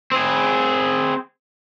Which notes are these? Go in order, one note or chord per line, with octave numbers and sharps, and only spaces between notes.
C4 G#4